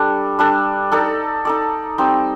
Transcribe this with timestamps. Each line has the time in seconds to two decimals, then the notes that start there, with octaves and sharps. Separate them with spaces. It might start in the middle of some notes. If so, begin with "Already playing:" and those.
Already playing: G3 D4 A4
0.39 G3 D4 A4
0.92 D#4 A4 D5
1.45 D#4 A4 D5
1.98 G3 C4 D#4